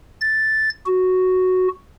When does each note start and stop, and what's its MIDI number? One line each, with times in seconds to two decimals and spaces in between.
0.21 0.70 93
0.86 1.68 66